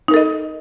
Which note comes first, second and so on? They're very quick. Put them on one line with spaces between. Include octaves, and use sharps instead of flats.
D#4 A#4 A4 D#5